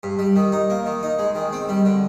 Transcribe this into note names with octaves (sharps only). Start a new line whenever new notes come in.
G2
G3
D#3
D#4
A#3
D#3
D#4
G#3
D#3
C4
G3
D3